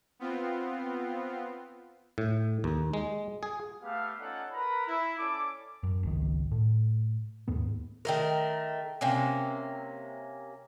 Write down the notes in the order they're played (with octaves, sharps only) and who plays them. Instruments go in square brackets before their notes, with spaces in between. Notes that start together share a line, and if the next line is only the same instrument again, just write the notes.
[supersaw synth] B3 C4 F4
[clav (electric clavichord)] A2
D#2
G#3
G#4
[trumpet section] A3 B3 G4 F5
C#4 D#4 F4 A4 D5 F#5
A#4 B4 A#5 B5
E4
C#4 A4 D5 D6
[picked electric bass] F#2
G#1 C#2 D#3
A2
D#2 G#2 B3
[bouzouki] D#3 A3 A#4
C3 A#3 C#4